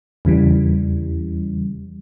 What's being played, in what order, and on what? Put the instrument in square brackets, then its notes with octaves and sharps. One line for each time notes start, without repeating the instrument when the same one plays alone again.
[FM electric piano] E2 C#3 E3 G3